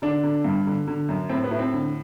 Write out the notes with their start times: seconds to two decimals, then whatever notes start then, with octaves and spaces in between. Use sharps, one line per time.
0.02 D3 D4
0.23 D3
0.44 G2
0.67 D3
0.87 D3
1.09 F#2
1.29 A2 C4
1.44 B3
1.51 A2
1.59 C4
1.73 D3